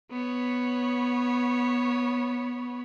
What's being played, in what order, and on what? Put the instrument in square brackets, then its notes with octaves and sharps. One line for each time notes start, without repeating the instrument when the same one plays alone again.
[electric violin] B3 C#5